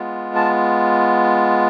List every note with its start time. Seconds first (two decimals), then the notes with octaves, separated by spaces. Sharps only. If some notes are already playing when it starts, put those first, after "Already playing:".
Already playing: G#3 B3 F4
0.35 A5